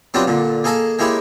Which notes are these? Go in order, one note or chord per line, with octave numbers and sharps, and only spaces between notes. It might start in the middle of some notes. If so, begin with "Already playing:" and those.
F#3 B3 C4 D4 F4 G4
A#2 D3
A#3 G#4 A4 D#5 A5
G#3 A#3 E4 G4 C#5